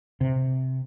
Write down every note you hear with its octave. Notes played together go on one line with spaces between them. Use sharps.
C3